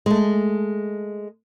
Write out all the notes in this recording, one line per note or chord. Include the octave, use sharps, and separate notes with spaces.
G#3 A3